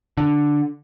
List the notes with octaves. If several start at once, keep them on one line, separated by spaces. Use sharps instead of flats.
D3